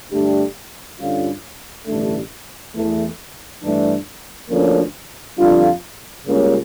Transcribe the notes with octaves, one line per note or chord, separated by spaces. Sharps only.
G2 D3 A3 D4 G4
G2 D3 G3 C#4 F4
A1 G2 D3 A3 D4
E2 E3 A3
G2 E3 A3 D4
D2 D3 F3 A#3 C#4
F2 D3 G3 D4 F4
C#2 C#3 G3 A#3 C#4